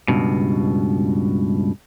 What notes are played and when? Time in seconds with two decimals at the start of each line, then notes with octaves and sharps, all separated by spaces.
0.08 C#2 G2 B2